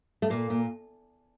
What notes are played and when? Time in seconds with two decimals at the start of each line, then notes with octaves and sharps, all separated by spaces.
0.22 A3
0.30 A#2 A#3
0.50 A#2